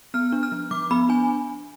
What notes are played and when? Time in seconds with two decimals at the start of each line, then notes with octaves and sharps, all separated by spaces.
0.14 B3 F6
0.32 D4
0.43 F6
0.52 F3
0.71 F3 D6
0.91 B3 B5
1.09 D4 G#5